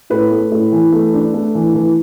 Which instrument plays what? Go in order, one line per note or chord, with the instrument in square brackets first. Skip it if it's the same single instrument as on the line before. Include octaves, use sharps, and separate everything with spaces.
[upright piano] A2 B4
A3
A2
E3
A3
D4
A3
E3
E3